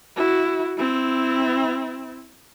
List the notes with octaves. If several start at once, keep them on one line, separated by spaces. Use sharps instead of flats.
E4 F#4
C4 E4